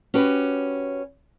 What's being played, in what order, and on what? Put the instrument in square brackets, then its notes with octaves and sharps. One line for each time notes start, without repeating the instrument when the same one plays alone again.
[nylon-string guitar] C#4 F#4 G4 B4